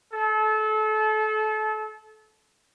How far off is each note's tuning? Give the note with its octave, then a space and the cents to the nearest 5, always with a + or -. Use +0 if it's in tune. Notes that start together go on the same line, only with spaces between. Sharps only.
A4 -30